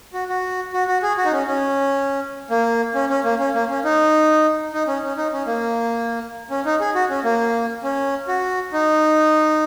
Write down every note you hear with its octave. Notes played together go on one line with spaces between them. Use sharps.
F#4
F#4
F#4
F#4
G#4
F#4
D#4
C#4
C#4
A#3
C#4
C#4
A#3
C#4
A#3
C#4
D#4
D#4
C#4
C#4
D#4
C#4
A#3
C#4
D#4
G#4
F#4
C#4
A#3
C#4
F#4
D#4